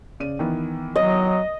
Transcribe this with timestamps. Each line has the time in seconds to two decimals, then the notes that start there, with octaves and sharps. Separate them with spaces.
0.20 C#3 D5 D#7
0.39 D#3 E3 B3
0.96 F#3 D#5